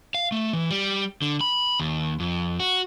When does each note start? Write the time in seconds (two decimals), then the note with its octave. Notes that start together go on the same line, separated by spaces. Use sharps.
0.14 F5
0.32 A3
0.53 E3
0.71 G3
1.22 D3
1.41 B5
1.80 D#2
2.20 F2
2.60 F#4